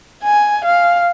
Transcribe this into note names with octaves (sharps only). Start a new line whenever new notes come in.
G#5
F5